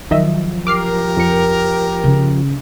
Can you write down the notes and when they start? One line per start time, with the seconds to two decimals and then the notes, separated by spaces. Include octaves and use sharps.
0.11 D#3 F3 F#3 D#5 E5
0.67 G4 A#4 D6 F6 C7
1.17 F2 C#7
2.04 C#3 C#4